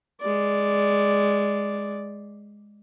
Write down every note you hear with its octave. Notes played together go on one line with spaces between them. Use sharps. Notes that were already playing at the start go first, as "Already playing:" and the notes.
G#3 D5